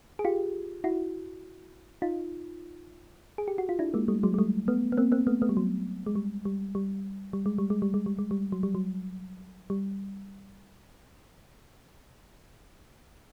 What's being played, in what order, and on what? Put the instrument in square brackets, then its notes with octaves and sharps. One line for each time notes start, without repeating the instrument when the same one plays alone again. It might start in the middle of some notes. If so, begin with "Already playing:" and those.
[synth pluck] G#4
F4 G4
E4 F#4
D#4 F4
G#4
G4
F#4
F4
D4 E4
G#3 A#3
G3 A3
F#3 G#3
G#3
G3 A3
A3 B3
B3
A#3 C4
A#3 C4
A3 B3
A3 B3
G3
F#3
G#3
G3
G3
G3
G3
G#3
G3
G#3
G3
G#3
G3
G#3
G3
F#3
G3
F#3
G3